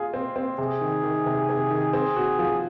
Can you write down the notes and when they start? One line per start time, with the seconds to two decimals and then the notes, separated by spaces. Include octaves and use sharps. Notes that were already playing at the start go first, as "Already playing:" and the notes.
Already playing: F4 G#4
0.14 C4
0.36 C4
0.58 C3 G#4
0.81 D#3
1.03 D#3
1.26 C3
1.49 C3
1.71 D#3
1.93 C4 G#4
2.16 F#4
2.39 F3